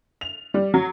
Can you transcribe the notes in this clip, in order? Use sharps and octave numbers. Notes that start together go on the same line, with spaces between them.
F7
G3
F#3